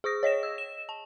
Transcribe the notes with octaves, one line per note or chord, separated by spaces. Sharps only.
G#4 C#6 D#6 A#6
C#5 D#5 A#6 E7
E6
E7
A5